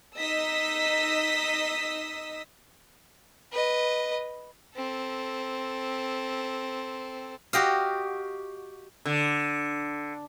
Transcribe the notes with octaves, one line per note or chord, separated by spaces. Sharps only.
D#4 D#5 D#6 E6 B6
B4 D#5
C4 A4
F#4 G4 D#5 F5
D3